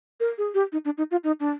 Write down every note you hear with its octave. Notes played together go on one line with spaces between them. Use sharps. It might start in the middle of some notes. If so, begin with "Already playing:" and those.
A#4
G#4
G4
D#4
D4
D#4
F4
D#4
D4